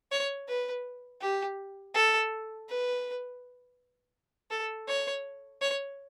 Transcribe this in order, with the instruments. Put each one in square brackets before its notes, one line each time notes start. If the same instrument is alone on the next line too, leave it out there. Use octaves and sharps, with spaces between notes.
[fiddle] C#5
B4
G4
A4
B4
A4
C#5
C#5